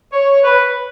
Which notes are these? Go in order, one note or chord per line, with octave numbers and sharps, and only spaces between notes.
C#5
B4